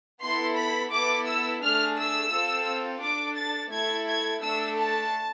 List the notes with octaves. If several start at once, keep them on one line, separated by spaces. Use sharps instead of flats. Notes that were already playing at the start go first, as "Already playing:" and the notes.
B3 E4 A4 C6
B5
B3 E4 A4 D6
E6
A3 D4 G#4 F6
E6
C4 F4 A4
D4 A4 D6
A6
A3 E4 A4 G#6
G#6
A3 D4 A4 E6
A5